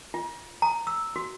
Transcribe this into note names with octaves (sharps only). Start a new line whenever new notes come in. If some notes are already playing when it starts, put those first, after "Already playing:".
F4
A#5
E6
F#4